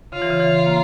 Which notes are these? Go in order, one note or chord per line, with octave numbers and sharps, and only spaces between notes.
C#3 F4
E3
C#3
E3
A#3